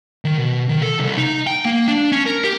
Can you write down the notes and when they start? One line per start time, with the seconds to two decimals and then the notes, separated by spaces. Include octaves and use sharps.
0.25 D#3
0.38 B2
0.69 D#3
0.82 A4
0.99 C2
1.17 D#4
1.47 G5
1.65 A#3
1.88 D4
2.12 C#4
2.26 A#4
2.44 G4